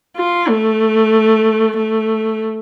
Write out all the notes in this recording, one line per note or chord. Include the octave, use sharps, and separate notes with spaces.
F4
A3
A3